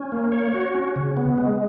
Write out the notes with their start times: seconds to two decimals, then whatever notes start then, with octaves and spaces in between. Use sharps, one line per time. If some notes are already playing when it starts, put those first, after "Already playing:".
Already playing: C#4
0.12 A#3
0.32 C#5
0.54 F#4
0.75 C#4
0.96 C#3
1.17 B3
1.38 G#3